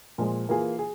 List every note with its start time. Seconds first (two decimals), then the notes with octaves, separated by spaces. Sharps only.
0.18 A#2 F3 G#3
0.49 E3 A#3 F4 G#4
0.79 G#4